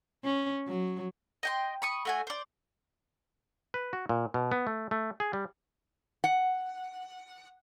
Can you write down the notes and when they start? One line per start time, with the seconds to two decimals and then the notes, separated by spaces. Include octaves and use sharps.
0.24 C#4
0.68 F#3
1.43 D#5 G5 C6
1.82 B5 C#6 D#6
2.05 A3 F#4 G#5
2.27 C5 D5
3.74 B4
3.93 F#4
4.09 A#2
4.34 B2
4.52 B3
4.67 A3
4.91 A3
5.20 G#4
5.33 G3
6.24 F#5